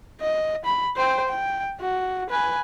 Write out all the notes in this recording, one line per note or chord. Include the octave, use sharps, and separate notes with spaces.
D#5
B5
C5 G5
G5
F#4
B4 G#5